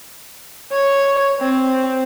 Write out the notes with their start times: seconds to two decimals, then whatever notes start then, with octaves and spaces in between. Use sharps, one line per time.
0.72 C#5
1.40 C4